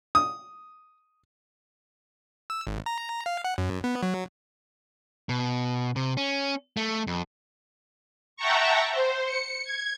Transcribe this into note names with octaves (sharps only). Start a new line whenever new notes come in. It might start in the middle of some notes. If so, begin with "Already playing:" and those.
D#6
E6
G#1
A#5
F5
F#5
F#2
B3
F#3
B2
C3
C#4
A3
F2
E5 F#5 G5 A5 A#5 C#6
C5
C#7
G#6